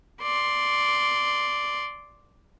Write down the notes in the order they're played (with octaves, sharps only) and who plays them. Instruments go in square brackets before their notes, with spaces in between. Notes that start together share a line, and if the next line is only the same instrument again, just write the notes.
[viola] D5 C6